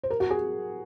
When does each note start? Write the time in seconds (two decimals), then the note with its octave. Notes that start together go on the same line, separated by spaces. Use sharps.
0.03 C5
0.10 A#4
0.20 F#4
0.30 G#4